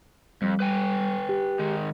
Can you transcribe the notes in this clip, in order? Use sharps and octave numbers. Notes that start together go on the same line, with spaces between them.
F2 G3
B4 G5 G#5
G4
D#3 G#3